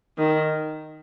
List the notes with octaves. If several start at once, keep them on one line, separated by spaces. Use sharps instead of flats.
D#3